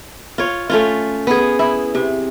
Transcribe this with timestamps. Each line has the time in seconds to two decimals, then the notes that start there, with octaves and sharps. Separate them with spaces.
0.38 F4 C#5
0.70 A3 C#4 F4
1.27 B3 G#4
1.59 E4
1.95 C3